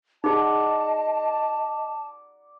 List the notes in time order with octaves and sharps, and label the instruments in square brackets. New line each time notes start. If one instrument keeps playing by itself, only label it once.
[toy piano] D#4 G#4 [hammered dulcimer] D5 F#5 A#5 [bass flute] D#5 [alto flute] A5